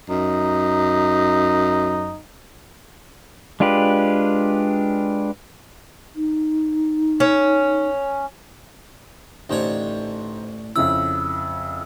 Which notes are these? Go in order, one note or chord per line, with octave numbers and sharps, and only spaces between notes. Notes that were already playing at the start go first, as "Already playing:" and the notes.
F#2 D#4
G#3 D4 F4 G4 B4
D#4
C#4
A1 D3 D#4 C5 C#5
F2 C#3 E4 B5 E6